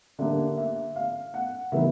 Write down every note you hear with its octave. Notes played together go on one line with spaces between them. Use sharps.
D3 G3 A#3 D4 E5
E5
F5
F#5
C#3 E3 G3 B3 D#4 E5